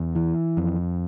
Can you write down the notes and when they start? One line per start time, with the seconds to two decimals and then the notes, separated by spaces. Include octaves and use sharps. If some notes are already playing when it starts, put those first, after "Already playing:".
Already playing: E2
0.15 E3
0.57 F2